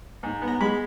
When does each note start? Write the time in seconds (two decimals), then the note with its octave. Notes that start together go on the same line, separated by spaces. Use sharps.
0.23 G#2
0.42 B3
0.48 A#5
0.60 G#3 B5